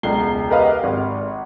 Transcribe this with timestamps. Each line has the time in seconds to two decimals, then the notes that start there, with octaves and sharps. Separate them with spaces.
0.03 E1 C#2 A#5 C7 G7
0.50 G4 A#4 B4 D#5 F5 F6
0.83 G#1